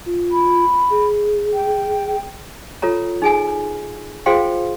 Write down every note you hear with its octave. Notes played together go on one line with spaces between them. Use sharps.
F4
B5
G#4
G5
F4 A4 C#5 A#5
D#4 G#4 G#5
F4 G#4 C5 F5 G5 C6